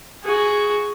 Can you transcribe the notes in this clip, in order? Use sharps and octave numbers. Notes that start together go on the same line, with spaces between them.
F#4 G#4